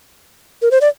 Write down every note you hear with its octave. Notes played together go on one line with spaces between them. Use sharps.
A#4
C5
D5